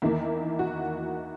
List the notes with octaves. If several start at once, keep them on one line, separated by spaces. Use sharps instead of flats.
E2 D#3 A#3 E4
F#4